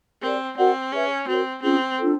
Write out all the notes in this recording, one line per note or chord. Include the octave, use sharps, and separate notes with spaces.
C4 G4 A#4 D5
C4 F#4 A#4 D5 F#5
C#4 G#4 B4 E5
C4 F#4 A#4 C#5
C4 C#4 F4 G#4
D4 F4 A4